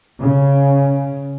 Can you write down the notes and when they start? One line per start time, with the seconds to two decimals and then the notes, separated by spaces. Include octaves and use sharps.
0.21 C#3